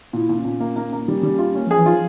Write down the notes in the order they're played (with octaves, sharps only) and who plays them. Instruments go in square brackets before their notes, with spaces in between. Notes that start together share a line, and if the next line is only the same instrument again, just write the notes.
[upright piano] A#2 [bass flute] E4
[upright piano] A#2
[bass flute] C#4
[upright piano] A#2
A#3
A#3
A#3
[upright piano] G3 [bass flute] C#4
[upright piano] G3
F4
[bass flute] A#3 [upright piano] C#4
[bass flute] F3 [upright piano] G#4
[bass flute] E3
[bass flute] F3 [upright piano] F4